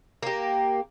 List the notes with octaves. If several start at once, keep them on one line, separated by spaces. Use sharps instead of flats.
A#3 G4